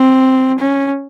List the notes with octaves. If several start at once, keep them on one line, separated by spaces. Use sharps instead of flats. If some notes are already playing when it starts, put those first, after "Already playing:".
Already playing: C4
C#4